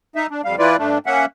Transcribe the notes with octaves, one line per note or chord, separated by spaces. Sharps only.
D#4 E5
D4
F2 G3 F5
E3 E4 F4 B4 D5
G2 A3 D4
A#3 C#4 E5 F#5